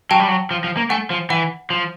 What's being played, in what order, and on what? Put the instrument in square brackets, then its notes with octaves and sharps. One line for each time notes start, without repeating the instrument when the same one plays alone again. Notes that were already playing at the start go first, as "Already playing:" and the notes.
[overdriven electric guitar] F#3 [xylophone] G5 A5
[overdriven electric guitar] G3
F#3
F3
F3
A#3
[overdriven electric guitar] A3 [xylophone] F#5 G#5
[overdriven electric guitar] F3
[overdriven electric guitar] E3 [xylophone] F#5
[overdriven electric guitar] F3